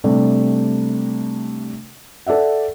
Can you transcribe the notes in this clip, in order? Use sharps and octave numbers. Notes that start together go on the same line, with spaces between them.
C3 G3 A3 D4
A4 D5 E5 F#5